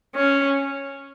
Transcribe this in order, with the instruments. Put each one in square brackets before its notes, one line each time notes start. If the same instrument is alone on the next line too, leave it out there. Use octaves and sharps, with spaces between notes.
[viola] C#4